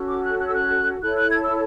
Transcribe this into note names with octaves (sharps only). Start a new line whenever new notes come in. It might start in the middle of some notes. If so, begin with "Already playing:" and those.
Already playing: C#4 F#4 A4
D6
F#6
F#6
E6
F#6
E4 A4 C#5 F#6
F#6
G#6
E6